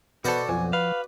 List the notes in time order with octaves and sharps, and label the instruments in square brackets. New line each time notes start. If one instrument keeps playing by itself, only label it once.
[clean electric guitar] B2 A4 [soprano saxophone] B3 [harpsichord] F#4 C5 D5
[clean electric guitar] B1 F2 [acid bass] F3 [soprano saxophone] G#5
[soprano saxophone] B4 [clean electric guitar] F5